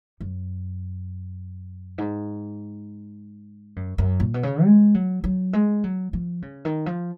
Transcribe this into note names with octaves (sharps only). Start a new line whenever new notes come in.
F#2
G#2
F#2
F#2
A#2
B2
C#3
G#3
F#3
F#3
G#3
F#3
F3
C#3
D#3
F3